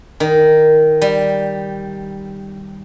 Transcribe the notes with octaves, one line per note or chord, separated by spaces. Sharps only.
D#3
G3